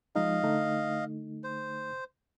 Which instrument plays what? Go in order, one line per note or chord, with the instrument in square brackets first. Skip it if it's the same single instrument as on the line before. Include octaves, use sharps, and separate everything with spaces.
[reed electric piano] F3 G#3 D#4 [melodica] D#5 F5
[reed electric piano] D3 A3 D#4
[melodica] C5